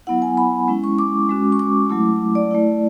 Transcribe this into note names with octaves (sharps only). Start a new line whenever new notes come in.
F#3 B3 E4 F#5
G#5
B5
G#3 C#4 E4
C#6
D6
G#3 C#4 F#4
C#6
D6
F#3 A3 E4
D5
A3 E4